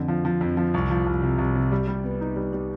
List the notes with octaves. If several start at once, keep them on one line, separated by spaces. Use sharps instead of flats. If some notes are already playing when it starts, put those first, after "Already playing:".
Already playing: F2 D3
F3
F3
F2
F3
C2
F3
C2
C3
C2
C3
G3
G3
B3
D#4
G3
G3